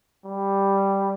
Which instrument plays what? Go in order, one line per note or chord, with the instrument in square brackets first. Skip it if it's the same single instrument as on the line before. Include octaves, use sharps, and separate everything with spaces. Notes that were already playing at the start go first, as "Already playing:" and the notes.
[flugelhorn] G3